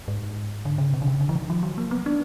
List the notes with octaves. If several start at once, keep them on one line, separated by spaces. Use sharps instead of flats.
G#2
D3
C#3
C3
D3
C#3
D3
E3
D#3
F3
F#3
A#3
B3
D4